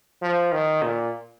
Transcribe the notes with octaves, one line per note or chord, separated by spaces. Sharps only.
F3
D#3
A#2